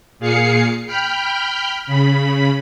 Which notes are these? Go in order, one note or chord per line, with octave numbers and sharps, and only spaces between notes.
A#2 G#4 F5 C7 C#7
G5 B5 F6 G6
C#3 B5